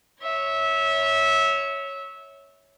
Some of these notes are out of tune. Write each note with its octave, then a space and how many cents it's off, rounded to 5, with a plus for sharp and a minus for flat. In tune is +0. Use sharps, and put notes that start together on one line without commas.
C#5 +0 E5 -20